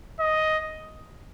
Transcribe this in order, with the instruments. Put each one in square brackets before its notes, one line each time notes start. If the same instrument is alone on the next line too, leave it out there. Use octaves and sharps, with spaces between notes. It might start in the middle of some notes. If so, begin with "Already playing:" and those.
[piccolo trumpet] D#5